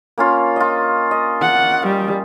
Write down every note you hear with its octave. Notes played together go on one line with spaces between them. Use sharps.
A#3 C#4 F4
F4 D#5
D#5
F#5
G3